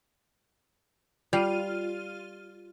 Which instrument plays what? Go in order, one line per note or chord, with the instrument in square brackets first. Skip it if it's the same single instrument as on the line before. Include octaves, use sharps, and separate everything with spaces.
[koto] G3 [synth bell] F4 F6 D#7